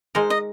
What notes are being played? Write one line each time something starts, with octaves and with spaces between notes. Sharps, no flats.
G#3 D#4 A#4 C5
D#5